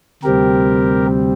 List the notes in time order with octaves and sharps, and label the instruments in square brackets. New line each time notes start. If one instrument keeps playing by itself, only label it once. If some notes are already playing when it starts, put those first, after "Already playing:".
[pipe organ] D2 C3 G3 C4 G4 A#4